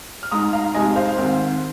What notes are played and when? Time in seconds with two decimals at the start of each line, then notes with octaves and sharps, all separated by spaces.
0.23 F6
0.31 G#2 G#3 D#4 A#5 D#6
0.53 F5 A#5
0.74 F2 C3 G#3 D#4 D#5 G#5
0.96 C5 F5
1.17 G#2 D#3 C4